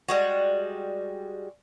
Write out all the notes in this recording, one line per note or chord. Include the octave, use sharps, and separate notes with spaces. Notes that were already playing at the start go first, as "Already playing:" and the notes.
G3 G#3 F#4